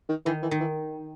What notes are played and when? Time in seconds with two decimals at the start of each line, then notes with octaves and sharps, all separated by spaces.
0.09 D#3
0.26 D#3 E3
0.42 E3
0.51 D#3
0.60 E3